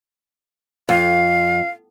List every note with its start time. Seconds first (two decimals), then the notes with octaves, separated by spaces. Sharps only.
0.89 F2 F5